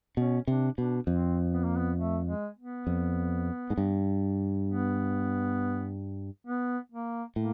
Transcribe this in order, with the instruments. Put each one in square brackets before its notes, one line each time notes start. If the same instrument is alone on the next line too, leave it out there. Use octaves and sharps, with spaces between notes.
[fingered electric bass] B2 [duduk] C#4
[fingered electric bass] C3 [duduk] D4
[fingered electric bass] B2 [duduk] D4
[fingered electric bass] F2 [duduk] C4
[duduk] B3
A#3
B3
A3
G#3
B3
[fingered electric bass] F2
G#2
G2
[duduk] B3
B3
A#3
[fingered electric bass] A2 [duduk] A#3